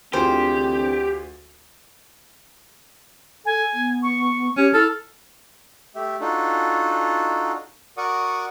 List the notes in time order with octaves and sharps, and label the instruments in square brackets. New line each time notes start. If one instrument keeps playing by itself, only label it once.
[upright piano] D2 F4 G#4 [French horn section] D3 E3 C4 [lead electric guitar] G4 [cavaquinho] C5
[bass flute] A4 [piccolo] G#5
[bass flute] B3
[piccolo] C#6
[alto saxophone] C#4 [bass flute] G4
[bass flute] E4 [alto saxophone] A4 [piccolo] F6
[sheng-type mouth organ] A3 G4 E5
D4 D#4 F4 F#4 A4
F#4 A#4 D5 F#5 C#6 D#6